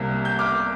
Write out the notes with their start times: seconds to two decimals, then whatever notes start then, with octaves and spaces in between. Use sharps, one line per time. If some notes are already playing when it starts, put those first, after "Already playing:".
Already playing: C2 C3 G3 A#3
0.25 G6
0.39 D6 F6